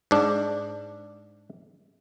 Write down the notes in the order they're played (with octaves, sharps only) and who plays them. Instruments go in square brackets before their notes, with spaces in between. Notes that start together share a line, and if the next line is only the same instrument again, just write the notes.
[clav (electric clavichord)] G#2 D4